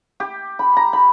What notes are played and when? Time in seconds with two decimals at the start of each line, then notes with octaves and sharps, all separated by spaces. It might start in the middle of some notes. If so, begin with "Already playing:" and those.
0.20 G4
0.59 B5
0.77 A#5
0.93 B5